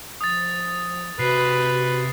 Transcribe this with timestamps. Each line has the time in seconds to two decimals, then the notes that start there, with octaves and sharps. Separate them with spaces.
0.21 F3 D#6 A6
1.19 C3 F#4 B4 C7